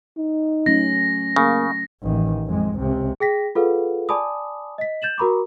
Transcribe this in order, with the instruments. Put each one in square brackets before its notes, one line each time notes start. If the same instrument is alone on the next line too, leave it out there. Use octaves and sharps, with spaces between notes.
[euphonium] D#4
[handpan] F#3 A3 C#4 [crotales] A#6
[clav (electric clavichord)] C#3 [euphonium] A#3
[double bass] A1 D#3
F2 G#3
C#2 C3
[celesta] G#4 G5 A#6 B6
F4 G#4 A4 B4 F5 F#5
D5 G#5 A5 B5 D6 D#6
D#5 B6
G6 A6 E7 F#7
F#4 A#4 A#5 B5 C#6 D6